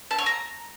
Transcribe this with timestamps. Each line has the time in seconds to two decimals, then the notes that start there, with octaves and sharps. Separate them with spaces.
0.11 A5
0.18 C#5
0.26 A#5